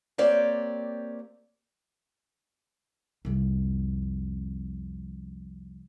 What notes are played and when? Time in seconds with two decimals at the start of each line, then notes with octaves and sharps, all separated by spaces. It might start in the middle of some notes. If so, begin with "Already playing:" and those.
0.18 A#3 C4 G4 C#5 D5
3.25 C2 F2